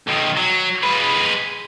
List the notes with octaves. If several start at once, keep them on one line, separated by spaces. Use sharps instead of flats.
B1 D#3
F#3
G#3 B4